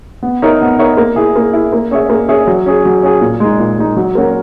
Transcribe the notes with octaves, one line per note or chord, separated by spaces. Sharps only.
B3
D#4 A#4 C#5 E5
B3
D#4 A#4 C#5 E5
A#3
E4 G#4
A#3
E4 G#4
A#3
C#4 G#4 C#5 E5
A#3
C#4 G#4 C#5 E5
F#3
C#4 G#4
F#3
C#4 G#4
A#2
G#3 D#4
A#2
G#3 D#4
F#3
A#3 C#4 F#4 A#4